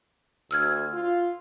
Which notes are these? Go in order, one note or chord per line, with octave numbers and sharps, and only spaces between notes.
D2 E6 F6 G#6
F4